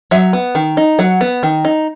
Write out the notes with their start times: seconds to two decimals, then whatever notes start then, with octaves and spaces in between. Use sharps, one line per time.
0.11 F#3 E5
0.33 B3
0.55 D#3
0.77 D#4
0.99 F#3 F#5
1.21 B3
1.43 D#3
1.65 D#4